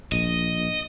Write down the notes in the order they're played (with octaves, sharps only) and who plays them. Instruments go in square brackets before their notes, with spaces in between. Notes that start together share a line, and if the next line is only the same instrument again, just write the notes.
[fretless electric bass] A#1 [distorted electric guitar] D#5